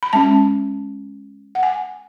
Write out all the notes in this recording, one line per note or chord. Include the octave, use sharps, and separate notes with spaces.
B5
G#3 C#4 A5
F#5
G#5